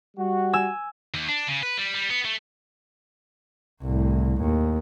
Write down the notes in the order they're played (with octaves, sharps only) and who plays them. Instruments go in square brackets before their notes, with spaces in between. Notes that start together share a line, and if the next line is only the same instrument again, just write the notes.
[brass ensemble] G3 F#4
[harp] G#5 E6
[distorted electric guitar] D#2
D4
C#3
B4
G3
G3
B3
A3
[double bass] C2 A2
D#2